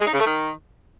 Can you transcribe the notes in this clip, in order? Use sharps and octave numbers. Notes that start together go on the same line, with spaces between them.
G#3
D#4
C#3
A3
D#3